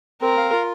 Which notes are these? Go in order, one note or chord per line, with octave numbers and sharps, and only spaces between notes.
C4 A#4
F5
F4